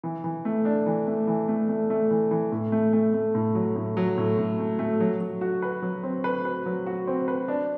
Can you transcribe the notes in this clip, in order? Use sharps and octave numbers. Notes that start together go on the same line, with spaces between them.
E3
E3
A3
D4
E3
A3
E3
A3
A3
A3
E3
E3
A2
A3
A3
A3
A2
F#3
A2
F#3
A2
A2
A3
A3
F#3
F#3
F#4
B4
F#3
C4
B4
B4
F#3
F#4
C4
B4
D4